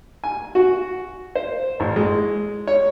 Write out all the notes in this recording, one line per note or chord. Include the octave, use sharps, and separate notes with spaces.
G#5
F#4
C5
A1
G#3
C#5